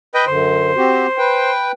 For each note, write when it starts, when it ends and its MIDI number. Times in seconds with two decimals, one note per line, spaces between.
0.14 0.25 71
0.14 0.25 75
0.14 0.25 79
0.27 0.73 42
0.27 0.73 50
0.27 1.51 72
0.76 1.07 60
0.76 1.07 66
0.76 1.07 67
1.18 1.72 71
1.18 1.72 79